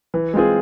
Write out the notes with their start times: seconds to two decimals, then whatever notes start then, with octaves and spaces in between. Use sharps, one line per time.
0.14 E3
0.34 G#3 C4 F4 G#4